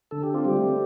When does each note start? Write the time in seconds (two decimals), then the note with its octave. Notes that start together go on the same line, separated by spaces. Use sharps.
0.11 D3 A4
0.23 G4
0.34 C4 F4
0.44 G3 G4
0.57 A3